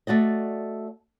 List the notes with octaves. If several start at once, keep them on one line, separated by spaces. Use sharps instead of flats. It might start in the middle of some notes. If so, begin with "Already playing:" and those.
A3 F#4 D5 D#5